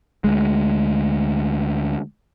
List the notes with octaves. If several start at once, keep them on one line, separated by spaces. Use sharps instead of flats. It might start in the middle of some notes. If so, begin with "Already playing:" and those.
D2 G#3